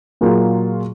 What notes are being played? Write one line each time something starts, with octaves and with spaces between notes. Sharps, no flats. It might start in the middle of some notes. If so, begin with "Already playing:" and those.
A#2 F#3 A#3 F4 G#4